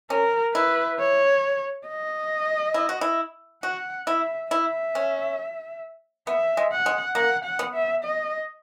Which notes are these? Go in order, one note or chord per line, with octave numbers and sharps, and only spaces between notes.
C#4 A#4
E4 B4
C#5
D#5
E4
F#4
E4
F#4 F#5
E4 E5
E4 E5
C#4
B3 E5
G#3
F#5
G#3
A#3 F#5
F#5
B3
E5
D#5